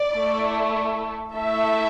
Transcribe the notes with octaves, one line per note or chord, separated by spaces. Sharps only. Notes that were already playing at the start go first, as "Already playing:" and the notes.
Already playing: D5
A3 E4 A4
A3 E4 A4 E5